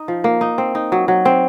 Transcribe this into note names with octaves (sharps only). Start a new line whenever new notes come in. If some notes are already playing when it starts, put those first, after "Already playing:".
Already playing: D#4
F3
A#3
D#4
C4
D#4
F#3
F#3
C4